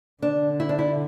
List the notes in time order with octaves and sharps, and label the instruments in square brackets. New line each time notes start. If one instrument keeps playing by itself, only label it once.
[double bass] D3 [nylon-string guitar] D4
[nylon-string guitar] E4
D4
E4